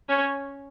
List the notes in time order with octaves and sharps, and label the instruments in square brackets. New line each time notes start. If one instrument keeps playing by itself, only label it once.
[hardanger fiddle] C#4 [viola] C#5